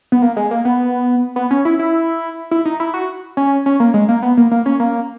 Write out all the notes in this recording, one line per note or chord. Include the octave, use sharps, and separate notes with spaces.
B3
A#3
G#3
A#3
B3
B3
C#4
E4
E4
E4
D#4
E4
F#4
C#4
C#4
A#3
G#3
A#3
B3
A#3
A#3
C#4
A#3